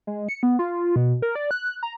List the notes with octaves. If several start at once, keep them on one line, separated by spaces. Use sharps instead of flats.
G#3
C#7
B3
F4
B2
A#4
D5
F#6
A#5